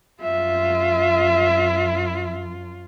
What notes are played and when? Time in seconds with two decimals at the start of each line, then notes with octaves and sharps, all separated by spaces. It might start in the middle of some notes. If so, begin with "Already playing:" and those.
0.22 F#2 F4 E5